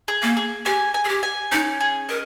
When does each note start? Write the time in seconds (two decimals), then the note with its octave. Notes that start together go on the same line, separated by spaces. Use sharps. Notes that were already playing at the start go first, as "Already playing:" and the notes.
0.08 G#4
0.22 A#3
0.37 G#4
0.66 G4 G#5
0.94 G#5
1.05 G#4
1.08 G4
1.23 G#5
1.52 C#4 D#4
1.80 G#4
2.09 A#4 D#5